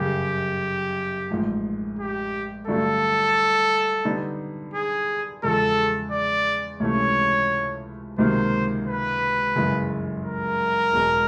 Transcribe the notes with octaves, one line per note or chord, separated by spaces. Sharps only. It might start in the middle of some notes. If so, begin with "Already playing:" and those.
Already playing: G1 F#2 C#3 G4
A1 G#2 F3
G4
G2 D3 F#3 A3 A4
D3 G3 B3 D#4
G#4
E2 C#3 F3 G#3 A4
D5
C#2 C3 E3 A3 C#4 C#5
C#2 C3 D#3 F#3 A#3 C5
B4
G1 F#2 C#3 E3 G#3
A#4
E1 E2 B2 G#3